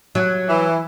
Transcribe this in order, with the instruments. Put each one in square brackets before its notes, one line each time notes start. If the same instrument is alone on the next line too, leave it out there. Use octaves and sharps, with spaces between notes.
[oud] F#3
[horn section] E3